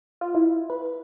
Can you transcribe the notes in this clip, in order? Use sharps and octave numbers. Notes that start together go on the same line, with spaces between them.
F4
E4
B4